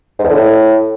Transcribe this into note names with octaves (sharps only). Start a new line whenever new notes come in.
G#2
E2
D3
A2